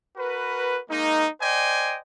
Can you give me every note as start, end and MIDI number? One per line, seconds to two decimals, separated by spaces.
0.16 0.78 66
0.16 0.78 70
0.16 0.78 71
0.89 1.26 56
0.89 1.26 58
0.89 1.26 63
1.40 1.97 72
1.40 1.97 74
1.40 1.97 75
1.40 1.97 79
1.40 1.97 80